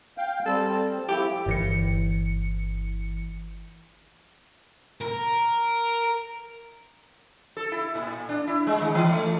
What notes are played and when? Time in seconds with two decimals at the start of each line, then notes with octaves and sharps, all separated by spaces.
0.18 F5 G5
0.46 G3 C4 A4
1.09 F3 E4 G4
1.46 G1 E3 C#7
5.01 A#4
7.57 A4
7.72 E4
7.95 A#2
8.29 D4
8.47 E4
8.67 G#3
8.81 D#3
8.95 E3
9.09 A3